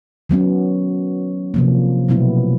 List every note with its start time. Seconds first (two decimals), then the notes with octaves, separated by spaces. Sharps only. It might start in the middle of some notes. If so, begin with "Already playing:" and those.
0.29 D#3 F#3 B3 C#4
1.54 C3 F3 A#3
2.09 B2 F#3 A3 B3 E4